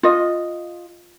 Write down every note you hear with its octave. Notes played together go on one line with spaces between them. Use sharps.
F4 D#5